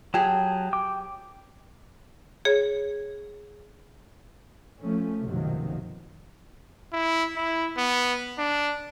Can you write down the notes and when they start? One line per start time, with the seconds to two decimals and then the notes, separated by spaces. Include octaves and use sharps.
0.14 F#3 G4 G#4 A5
0.73 G5 D6
2.45 G#4 C#5
4.81 F3 A3 C#4
5.23 F#1 B1 C3 D#3 F3 F#3
6.93 E4
7.36 E4
7.77 B3
8.39 D4